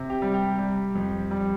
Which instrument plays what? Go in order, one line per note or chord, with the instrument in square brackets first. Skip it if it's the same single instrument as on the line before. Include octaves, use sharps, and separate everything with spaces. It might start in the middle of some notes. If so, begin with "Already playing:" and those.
Already playing: [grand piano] C3
G4
G3
G4
G3
F2
G3